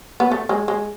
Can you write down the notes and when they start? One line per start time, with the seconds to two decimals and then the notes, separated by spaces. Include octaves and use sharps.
0.20 B3
0.32 A3
0.49 G#3
0.68 G#3